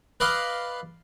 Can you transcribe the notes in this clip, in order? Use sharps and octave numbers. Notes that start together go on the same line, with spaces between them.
B4 D5 D#5 F5